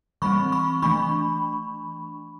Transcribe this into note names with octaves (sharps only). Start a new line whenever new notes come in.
E3 G3 C4 B5 C#6
B5 C#6
E3 A3 D4 B5 C#6